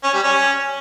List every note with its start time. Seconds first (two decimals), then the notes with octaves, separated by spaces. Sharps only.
0.03 C#4
0.13 G3
0.23 C#4